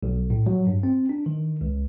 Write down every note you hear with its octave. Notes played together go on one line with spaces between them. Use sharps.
B1
A2
F#3
G2
C4
D4
D#3
C#2